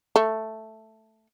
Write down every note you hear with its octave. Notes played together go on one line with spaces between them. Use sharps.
A3